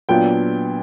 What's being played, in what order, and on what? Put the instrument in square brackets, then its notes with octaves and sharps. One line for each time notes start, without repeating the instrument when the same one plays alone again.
[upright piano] A#2 F#3 B3 D4 F4 G5